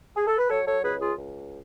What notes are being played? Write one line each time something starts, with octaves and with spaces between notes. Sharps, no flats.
G#4
A4
B4
F#3 A4 C#5
A4 C#5
C#2 G#4 B4
F4 G#4
C#2